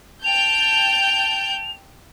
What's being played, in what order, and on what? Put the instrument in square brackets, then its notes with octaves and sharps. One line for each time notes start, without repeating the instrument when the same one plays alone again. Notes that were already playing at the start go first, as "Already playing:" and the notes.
[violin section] G5 A5 G6 [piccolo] F7